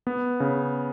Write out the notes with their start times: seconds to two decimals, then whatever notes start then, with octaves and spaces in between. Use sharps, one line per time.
0.07 B3
0.40 C#3